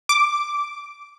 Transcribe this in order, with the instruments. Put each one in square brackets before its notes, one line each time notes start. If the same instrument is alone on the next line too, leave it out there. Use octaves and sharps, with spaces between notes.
[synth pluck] D6